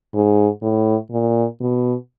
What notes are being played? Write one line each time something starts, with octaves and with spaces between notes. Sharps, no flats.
G#2
A2
A#2
B2